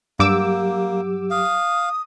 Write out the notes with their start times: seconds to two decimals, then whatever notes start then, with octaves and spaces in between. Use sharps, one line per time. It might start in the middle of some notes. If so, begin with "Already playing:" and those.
0.19 G2 F#3 A#3 G4 D6 E6
1.30 F5 D#6